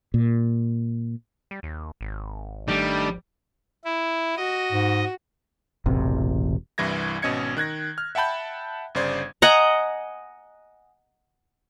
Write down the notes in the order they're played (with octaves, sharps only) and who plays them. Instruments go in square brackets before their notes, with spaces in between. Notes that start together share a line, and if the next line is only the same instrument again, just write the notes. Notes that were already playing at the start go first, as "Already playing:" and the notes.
[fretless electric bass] A#2
[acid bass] G3
D#2
G#1
[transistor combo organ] D#3 A3 D4 [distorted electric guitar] G3
[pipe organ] E4
[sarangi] F#4 [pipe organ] D#5
[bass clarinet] G#2
[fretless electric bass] E1 A1 C3
[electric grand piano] C2 G2 E3 E4 G#6 A#6
G#1 B2 C#4 D#5 G#6 C#7
D#3 F#6 G#6 A#6
F6
E5 F#5 G5 A5 B5 G6
G1 C#3 C5 D5 G#6
[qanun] D#5 F#5 G#5 A#5